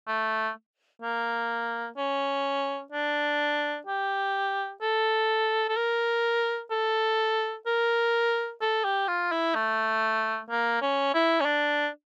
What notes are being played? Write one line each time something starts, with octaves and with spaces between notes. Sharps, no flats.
A3
A#3
C#4
D4
G4
A4
A4
A#4
A4
A#4
A4
G4
F4
E4
A3
A#3
C#4
E4
C#4
D4